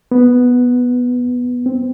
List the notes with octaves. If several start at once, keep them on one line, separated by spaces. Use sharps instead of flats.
B3
C4